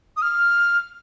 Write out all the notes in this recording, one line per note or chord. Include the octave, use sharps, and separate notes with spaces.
D#6
F6